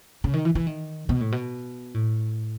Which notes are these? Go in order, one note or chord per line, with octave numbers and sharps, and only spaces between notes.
C#3
D#3
E3
E3
D#3
B2
A2
B2
A2